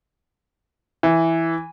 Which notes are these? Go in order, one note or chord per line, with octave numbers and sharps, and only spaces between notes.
E3